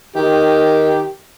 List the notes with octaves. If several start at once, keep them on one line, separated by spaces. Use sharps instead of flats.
D#3 G4